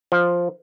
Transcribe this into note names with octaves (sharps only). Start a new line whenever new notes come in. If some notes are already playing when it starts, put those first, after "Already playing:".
F3